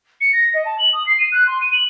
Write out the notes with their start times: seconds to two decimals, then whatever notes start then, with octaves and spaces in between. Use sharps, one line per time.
0.21 C#7
0.33 A#6
0.54 D#5
0.65 A5
0.78 F#7
0.93 D#6
1.06 C7
1.19 D#7
1.32 F#6
1.47 C6
1.61 D#7
1.73 F#7